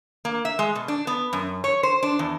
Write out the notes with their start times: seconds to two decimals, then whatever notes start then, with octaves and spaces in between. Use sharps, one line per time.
0.25 A#3
0.45 E5
0.59 G#3
0.75 B2
0.88 D4
1.07 B3
1.33 F#2
1.64 C#5
1.83 C5
2.03 D4
2.19 E2